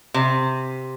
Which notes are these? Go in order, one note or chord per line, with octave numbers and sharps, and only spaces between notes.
C3